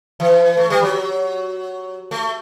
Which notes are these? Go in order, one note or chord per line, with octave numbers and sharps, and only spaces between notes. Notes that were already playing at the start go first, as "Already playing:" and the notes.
E3
A3
G3
F#3
A3